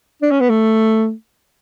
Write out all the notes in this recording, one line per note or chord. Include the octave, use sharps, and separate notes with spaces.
D4
C#4
B3
A3